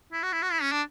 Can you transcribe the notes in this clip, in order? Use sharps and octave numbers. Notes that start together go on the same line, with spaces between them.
E4
F#4
E4
F#4
E4
C#4
D4